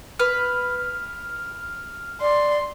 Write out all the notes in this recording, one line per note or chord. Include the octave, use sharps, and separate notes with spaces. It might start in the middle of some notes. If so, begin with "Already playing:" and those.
B4 F6
D5 C6